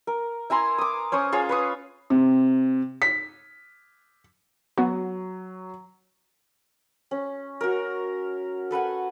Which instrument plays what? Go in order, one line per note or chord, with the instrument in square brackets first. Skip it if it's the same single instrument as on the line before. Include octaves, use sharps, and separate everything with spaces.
[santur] A#4
E4 G#5 A#5 C6
D6 D#6
C#4 C5 C#6 D#6
F4 G#4 C#5
B4 C#6 D#6
[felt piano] C3
B6
[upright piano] F#3 [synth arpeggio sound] B3 F#4
[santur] C#4
F#4 A#4
A4 B4 F#5 G#5